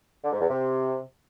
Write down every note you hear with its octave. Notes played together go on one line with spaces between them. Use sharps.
D3
G#2
E2
C3